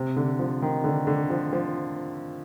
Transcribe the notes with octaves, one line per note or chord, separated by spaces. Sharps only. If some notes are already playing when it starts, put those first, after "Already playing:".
Already playing: C3
D3
F3
D#3
D3
D3
F3
F3